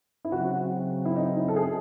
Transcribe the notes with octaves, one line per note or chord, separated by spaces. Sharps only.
E4
C#3 F#3 C4 F#4
E4
D#4
E4
A4
G#4